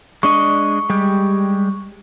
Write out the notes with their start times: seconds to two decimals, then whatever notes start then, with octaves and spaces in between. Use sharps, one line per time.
0.23 G#3 D4 D#5 C#6
0.90 G3 G#3 G4